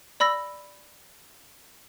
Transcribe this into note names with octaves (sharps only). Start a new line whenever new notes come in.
D5 B5 E6 A#6